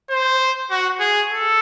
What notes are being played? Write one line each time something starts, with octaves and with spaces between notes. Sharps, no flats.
C5
F#4
G#4
A4